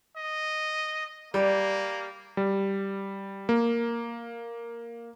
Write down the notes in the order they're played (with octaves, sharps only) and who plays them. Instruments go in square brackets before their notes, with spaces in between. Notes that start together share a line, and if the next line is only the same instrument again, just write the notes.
[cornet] D#5
[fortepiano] G3 [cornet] A#3
[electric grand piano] G3
A#3